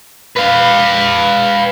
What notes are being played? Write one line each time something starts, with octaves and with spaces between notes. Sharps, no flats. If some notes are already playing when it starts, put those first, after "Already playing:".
B4 F5